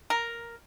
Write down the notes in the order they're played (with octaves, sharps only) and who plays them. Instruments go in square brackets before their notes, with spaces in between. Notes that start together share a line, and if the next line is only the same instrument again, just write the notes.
[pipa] A#4